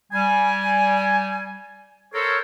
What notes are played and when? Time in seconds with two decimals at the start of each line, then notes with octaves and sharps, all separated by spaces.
0.13 G3 G#5
2.14 A4 A#4 C5 C#5